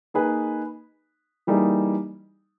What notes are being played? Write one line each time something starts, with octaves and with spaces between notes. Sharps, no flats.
A#3 D#4 G#4 B4
E3 G3 A#3 D#4 G#4